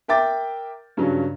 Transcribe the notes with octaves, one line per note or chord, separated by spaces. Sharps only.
A#4 E5 G5 D6 A6
G2 C#3 F#3 C#4